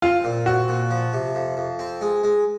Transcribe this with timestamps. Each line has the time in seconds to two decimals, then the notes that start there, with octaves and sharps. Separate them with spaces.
0.02 C4 F4
0.24 A#2
0.46 C4 F#4
0.68 A#2
0.91 F3
1.13 C3
1.35 F2
1.57 F2
1.79 C4
2.01 G#3
2.23 G#3